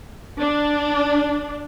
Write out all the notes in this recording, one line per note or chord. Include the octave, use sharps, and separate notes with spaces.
D4